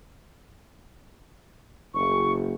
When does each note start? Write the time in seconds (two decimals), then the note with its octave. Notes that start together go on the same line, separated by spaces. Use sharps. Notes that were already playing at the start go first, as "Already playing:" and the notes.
1.94 F#1 C#6